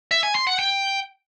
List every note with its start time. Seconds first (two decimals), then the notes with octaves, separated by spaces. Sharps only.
0.11 E5
0.23 G#5
0.35 C6
0.47 F#5
0.59 G5